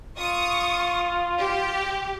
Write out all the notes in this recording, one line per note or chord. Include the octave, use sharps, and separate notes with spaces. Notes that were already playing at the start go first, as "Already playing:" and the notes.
F4 C#6 D#6
G4